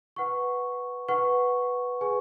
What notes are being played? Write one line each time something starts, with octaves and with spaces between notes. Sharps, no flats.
B4 F#5 C#6
B4 F#5 C#6
G#4 B4 G#5 C#6